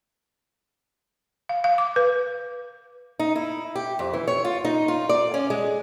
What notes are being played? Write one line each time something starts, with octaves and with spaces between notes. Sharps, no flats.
F5
F5
D6
B4
D#4
E4
G4
F2
E3
C#5
F4
D#4
F4
D5
C#4
G#3